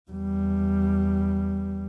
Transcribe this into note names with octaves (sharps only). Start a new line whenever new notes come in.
E2 G3